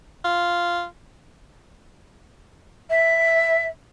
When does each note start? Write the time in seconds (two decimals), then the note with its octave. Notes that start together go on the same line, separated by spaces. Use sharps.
0.25 F4
2.90 E5